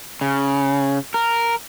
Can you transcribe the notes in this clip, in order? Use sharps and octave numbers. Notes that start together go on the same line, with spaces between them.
C#3
A#4